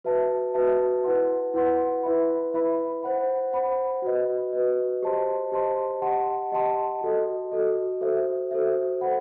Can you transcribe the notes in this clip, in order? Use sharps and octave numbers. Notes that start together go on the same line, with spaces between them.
F#4 B4 E5 A5
F#4 B4 E5 A5
E4 B4 F#5 C6
E4 B4 F#5 C6
E4 B4 E5 B5
E4 B4 E5 B5
C5 F#5 B5
C5 F#5 B5
F#4 B4 D#5
F#4 B4 D#5
G4 C5 D#5 A5 C6
G4 C5 D#5 A5 C6
G4 D#5 F#5 A5 C6
G4 D#5 F#5 A5 C6
F#4 A4 D#5
F#4 A4 D#5
F#4 A4 C5 E5
F#4 A4 C5 E5
A4 C5 F#5 B5